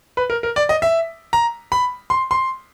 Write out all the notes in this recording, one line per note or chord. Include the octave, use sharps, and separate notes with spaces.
B4
A#4
A#4
D5
D#5
E5
A#5
B5
C6
C6